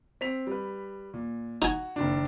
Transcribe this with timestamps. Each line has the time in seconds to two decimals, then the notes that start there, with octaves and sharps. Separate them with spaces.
0.21 C4 B6 F7
0.47 G3 B4
1.14 A#2
1.62 D#4 F#4 G#5
1.96 F#1 D#3 D4